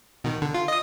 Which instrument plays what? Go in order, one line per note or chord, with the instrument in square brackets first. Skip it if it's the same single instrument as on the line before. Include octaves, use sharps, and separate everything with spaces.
[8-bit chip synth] B2 D#3
D3
F4
D#5 D#6